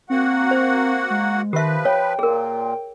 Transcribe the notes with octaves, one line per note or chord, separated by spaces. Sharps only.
A#3 C4 F#4 F#5
C5
G#3
D#3 F3 G4 B4 E5
C#5 G5
A#2 G#4 A#4